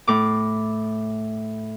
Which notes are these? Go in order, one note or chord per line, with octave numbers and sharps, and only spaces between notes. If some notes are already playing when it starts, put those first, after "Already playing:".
A2 D6